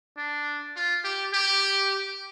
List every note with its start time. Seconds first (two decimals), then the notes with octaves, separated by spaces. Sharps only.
0.17 D4
0.76 F4
1.04 G4
1.34 G4